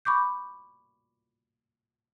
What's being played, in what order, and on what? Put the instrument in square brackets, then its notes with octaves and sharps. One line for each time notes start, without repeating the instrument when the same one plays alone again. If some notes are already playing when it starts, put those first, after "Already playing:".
[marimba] B5 C#6 D6 G6